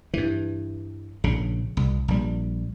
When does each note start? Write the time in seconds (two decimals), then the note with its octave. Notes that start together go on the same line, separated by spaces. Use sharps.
0.14 G2 E3
1.24 A#1 C#3
1.77 C2
2.08 A#1 G3